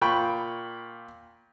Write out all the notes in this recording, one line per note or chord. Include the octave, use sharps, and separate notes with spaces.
A#2 G5 B5 C#6